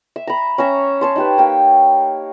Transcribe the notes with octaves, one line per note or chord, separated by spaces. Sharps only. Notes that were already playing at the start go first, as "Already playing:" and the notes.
E5
A#5 B5
C#4 E5 A#5
C#5 A5 C6
D#4 G4 B4
A#3 G5